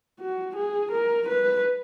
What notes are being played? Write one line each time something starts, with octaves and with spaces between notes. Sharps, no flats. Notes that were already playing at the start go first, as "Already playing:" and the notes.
F#4
G#4
A#4
B4